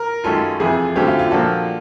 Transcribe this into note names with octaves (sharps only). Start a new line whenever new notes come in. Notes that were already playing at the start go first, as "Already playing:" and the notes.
Already playing: A#4
F#2 D#3 G#3 C#4 F4 A4
F2 C3 E3 G#4
F#2 D3 F#3 A3 C4 G4
F4
F4
A#2 F3 A#3 D4 F#4 A4